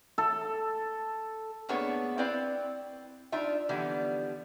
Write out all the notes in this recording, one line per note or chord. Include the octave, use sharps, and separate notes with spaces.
A4
A2 A#3 B3 D4 G#4 C#5
C4 E4 B4 D5 F5
D4 D#4 F4 E5
D3 E3 F3 G3 B3